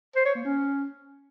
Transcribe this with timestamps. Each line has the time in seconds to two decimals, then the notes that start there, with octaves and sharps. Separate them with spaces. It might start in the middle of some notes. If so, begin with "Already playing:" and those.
0.16 C5
0.26 C#5
0.35 A#3
0.45 C#4